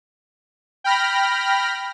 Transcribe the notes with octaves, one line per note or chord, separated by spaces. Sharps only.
G5 B5 F6 A#6